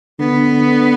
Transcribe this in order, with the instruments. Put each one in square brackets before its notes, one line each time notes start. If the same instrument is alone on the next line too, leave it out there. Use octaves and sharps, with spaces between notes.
[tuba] D3 [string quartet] B3